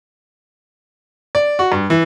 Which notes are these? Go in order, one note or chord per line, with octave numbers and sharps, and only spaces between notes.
D5
F#4
G2
E3